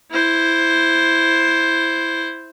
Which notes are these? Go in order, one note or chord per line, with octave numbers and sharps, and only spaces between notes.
E4 C5